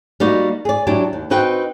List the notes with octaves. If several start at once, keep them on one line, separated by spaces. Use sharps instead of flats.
G3 A#3 D#4 F#4
G#4 D5
F#3 D4 E4 G4
D#2
C4 D#4 F#4 B4 D#5 G5